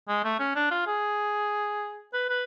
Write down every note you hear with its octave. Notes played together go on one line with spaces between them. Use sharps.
G#3
A3
C#4
D4
F4
G#4
B4
B4